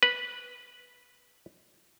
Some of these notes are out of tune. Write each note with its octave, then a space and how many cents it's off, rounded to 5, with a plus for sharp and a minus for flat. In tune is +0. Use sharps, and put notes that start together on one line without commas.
B4 -10